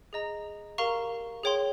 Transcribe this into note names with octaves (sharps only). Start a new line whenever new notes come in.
G#4 D#5 A#5
G4 A#4 F5 A#5 C#6
G#4 C#5 G5 C6